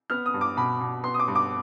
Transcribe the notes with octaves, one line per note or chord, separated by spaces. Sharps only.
B3 F6
D#6
G2
D6
B2 B5
B2
B3 C6
D#6
D6
G2
D6